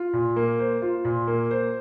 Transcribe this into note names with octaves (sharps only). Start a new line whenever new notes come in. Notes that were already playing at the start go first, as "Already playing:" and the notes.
Already playing: F4
A#2
A#3
C5
F4
A#2
A#3
C5